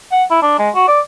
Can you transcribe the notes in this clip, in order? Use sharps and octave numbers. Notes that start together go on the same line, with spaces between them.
F#5
E4
D4
G#3
F#4
D5